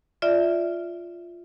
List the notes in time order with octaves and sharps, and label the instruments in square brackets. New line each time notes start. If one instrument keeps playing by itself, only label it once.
[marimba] F4 D5 E5